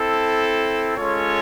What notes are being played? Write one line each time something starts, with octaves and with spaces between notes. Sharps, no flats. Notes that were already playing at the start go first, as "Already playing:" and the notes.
Already playing: C4 E4 A4
G#3 C#4 F4 A4 C#5